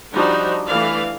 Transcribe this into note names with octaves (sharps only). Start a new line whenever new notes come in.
F3 G3 D4 D#4 F#4
E3 A3 D5 F5